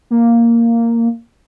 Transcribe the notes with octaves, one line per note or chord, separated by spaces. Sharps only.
A#3